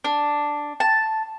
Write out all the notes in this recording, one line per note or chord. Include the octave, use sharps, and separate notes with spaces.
D4
A5